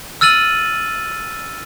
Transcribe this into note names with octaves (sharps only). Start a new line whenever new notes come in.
E6 F6 A6 D#7 F#7